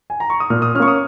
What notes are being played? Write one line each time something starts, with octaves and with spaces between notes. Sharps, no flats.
G#5
A#5
C#6
D#6
A#2 F6
D#6
A#3 C#4 C#6 F6
D#6